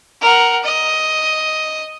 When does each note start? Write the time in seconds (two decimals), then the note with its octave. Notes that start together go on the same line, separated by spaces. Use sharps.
0.21 A#4 F#5
0.64 D#5